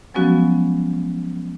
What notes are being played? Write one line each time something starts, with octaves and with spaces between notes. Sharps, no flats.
F3 F#3 G#3 B3 C#4 F#4